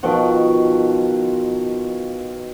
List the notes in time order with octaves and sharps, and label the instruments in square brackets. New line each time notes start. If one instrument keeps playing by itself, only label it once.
[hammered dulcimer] B2 D#3 F3 F#5